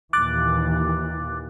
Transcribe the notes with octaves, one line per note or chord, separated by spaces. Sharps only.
D#2 A#2 E3 D6 F#6 A6